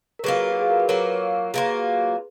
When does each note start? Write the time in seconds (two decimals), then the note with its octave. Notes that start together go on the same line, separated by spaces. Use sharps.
0.19 A#4
0.24 F#3 A#3 F4 G#4 B4
0.52 F#4
0.61 G#4
0.70 A#4
0.80 B4
0.88 F#3 A#3 F4 A#4 C#5
1.54 F#3 A#3 F4 G#4 B4